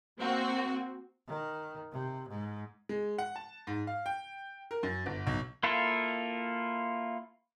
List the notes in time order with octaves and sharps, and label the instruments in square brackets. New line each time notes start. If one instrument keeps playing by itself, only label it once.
[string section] A#3 C4 F#4
[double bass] D#3
C3
G#2
[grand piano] G#3
F#5
A5
G#2
F5
G5
A#4
F#2
G1
B1
[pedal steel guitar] A#3 E4 F4 A4